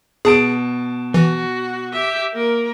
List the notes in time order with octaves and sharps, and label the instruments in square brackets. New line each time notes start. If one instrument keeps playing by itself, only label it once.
[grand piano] B2 A5 D7 [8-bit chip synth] G#4
[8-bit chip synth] E3 [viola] F#4
[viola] G4 E5
A#3 A#4